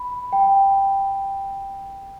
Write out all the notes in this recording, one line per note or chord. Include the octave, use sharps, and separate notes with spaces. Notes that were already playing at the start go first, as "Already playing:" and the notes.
Already playing: B5
G5